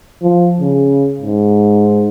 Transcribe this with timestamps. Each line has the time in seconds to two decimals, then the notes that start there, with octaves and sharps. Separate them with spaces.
0.23 F3
0.60 C#3
1.21 G#2